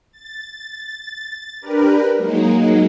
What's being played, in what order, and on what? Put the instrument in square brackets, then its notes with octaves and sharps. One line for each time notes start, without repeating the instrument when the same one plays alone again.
[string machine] A6
D4 G4 A#4 B4
F#3 G#3 A#3 D#4